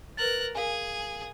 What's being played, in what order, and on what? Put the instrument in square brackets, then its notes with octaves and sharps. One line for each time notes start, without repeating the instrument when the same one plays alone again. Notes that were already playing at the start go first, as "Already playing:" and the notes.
[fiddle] A#4 F#6 [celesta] B4 A6
[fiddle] G#4 [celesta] A#4 F5 G#5